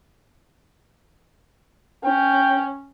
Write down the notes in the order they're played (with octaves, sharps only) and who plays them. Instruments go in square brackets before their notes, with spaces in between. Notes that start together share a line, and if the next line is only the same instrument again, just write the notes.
[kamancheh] C#4 [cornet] G5